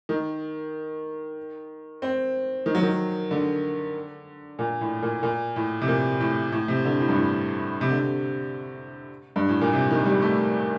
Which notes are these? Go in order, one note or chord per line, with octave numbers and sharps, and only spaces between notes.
D#3
C4
D#3
F#3
D#3
D3
A#2
A2
A#2
A#2
A2
C3
A#2
A2
A2
C3
D3
A2
G2
A2
C3
D3
C3
G2
A2
A#2
C3
D#3
G3
A3